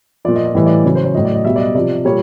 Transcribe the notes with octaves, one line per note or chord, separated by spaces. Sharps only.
A#2 F3 D5
D#5
D5
A2 E3 G3 D#5
D5
C#3 F#3 C#5
C5
C#5
A2 F#3 D#5
D5
D#5
B2 G3 E5
D5
D#5
C3 F3 D5
A#2 G3 C#5